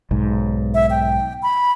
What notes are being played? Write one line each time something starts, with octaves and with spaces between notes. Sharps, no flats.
B1 G#2
E5
G5
B5